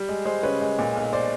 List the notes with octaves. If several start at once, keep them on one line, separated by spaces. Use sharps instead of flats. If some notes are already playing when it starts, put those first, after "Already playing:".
Already playing: G3
G#3
G#3 C5
C#3 B4 C#5
G#3
A#2
B1
C5 D5